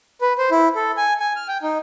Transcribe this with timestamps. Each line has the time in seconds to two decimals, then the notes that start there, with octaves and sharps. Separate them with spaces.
0.21 B4
0.38 C5
0.51 E4
0.75 A4
0.97 G#5
1.20 G#5
1.36 F6
1.48 G5
1.62 D#4